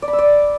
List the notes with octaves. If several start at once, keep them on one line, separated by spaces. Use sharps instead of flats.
D5
B5
E6
D5